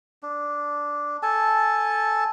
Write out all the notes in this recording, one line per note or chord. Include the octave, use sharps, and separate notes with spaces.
D4
A4 G#5 A5